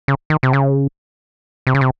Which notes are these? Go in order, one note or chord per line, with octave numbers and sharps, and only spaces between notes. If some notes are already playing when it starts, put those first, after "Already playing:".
C#3
D#3
C3
C#3
C3
C#3
C3